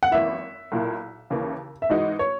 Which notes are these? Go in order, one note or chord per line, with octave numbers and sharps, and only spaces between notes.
F#5
G#1 F#2 E3 A#3 E4 E5
B1 A#2 A#3 E4
D#2 C#3 E3 A#3
E5
G#2 E3 G#3 D#4 F#4 D#5
C#5